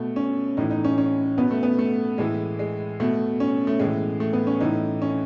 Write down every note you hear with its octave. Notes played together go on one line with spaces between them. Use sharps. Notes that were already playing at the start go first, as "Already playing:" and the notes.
Already playing: B2 A3
C#4
A2 E3 D#4
D#4
C#4
C#4
B2 B3
A3
B3
A3
A2 E3 G#3
G#3
B2 A3
C#4
A3
A2 E3 G#3
A3
B3
C#4
A2 E3 D#4
C#4